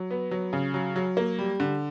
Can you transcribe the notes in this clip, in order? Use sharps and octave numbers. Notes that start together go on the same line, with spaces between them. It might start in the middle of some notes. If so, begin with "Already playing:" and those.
Already playing: F#3
B3
F#3
C#3
F#3
F#3
A#3
G3
D3